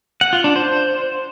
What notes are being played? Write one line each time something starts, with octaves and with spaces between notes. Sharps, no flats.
F#5
F4
D4
C5